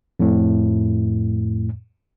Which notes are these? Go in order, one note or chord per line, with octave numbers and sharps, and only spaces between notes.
F2 A2